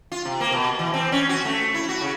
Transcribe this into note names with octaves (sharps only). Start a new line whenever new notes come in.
F4
C3
A#3
B2
E3
C4
C#4
F#4
A3
E4
F#4
C#3